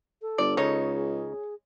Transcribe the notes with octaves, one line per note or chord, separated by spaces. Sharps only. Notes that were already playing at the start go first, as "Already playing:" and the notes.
A4
G1 D5
C#2 C#3 D#4 C#5
G#4